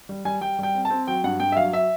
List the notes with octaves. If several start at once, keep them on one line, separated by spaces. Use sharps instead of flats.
G3
G3 G#5
G3 G5
G3 G5
C4
A5
C4
F#3 G5
G2 F#5
G2 G5
E5
F#3 F5
E5